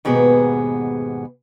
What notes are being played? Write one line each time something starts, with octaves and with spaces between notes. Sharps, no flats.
D#2 G#2 B2 B3 G#4